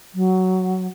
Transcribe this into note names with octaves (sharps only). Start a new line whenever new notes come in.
F#3